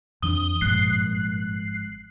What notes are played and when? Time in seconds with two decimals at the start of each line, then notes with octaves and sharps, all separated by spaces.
0.22 F2 E3 D4 D#6 G7
0.61 G#1 G2 A#2 F3 G#3 F#6 C7